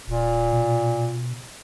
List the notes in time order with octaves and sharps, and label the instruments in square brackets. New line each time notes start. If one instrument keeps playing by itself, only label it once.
[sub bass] D1 [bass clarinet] A#2
[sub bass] B2